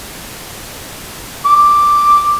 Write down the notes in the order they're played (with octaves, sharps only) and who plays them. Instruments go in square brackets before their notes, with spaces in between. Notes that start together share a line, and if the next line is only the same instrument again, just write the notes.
[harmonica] D6